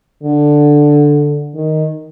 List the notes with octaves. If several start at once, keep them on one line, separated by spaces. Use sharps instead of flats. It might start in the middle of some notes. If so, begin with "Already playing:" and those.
D3
D#3